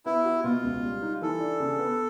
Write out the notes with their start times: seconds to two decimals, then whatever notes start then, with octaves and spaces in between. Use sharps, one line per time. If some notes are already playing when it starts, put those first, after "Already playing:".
0.06 B3 E4
0.25 F#4
0.44 B2 F4
0.64 C#2
0.83 G3
1.02 D#4
1.22 E3 A4
1.40 D4
1.60 C#3
1.79 B3